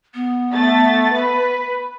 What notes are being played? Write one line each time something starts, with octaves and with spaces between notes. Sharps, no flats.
B3
A3 A6
B4